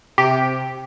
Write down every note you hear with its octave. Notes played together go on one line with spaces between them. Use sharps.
C3 G4